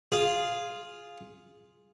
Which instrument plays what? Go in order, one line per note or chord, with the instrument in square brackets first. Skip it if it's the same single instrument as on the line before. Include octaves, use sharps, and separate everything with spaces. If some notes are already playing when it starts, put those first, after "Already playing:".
[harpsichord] F4 G#4